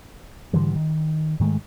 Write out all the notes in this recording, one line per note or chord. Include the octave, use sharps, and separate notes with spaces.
G#2 D3 E3 G3
D#3
G#2 D#3 G#3 A3